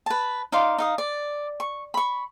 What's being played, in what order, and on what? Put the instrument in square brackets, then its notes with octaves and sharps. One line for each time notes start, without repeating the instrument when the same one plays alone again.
[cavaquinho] B4 A5
D#4 D5 F5 C6
D#4 F5 D#6
D5
C#6
B5 C#6